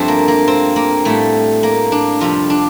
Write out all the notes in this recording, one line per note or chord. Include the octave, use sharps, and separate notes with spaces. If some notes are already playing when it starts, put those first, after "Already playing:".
Already playing: G2 F3 A3 C4 D4
A#3
A#3
C4
A#3
A2 G3 A3
A#3
D4
F2 C3 G3 F4
D4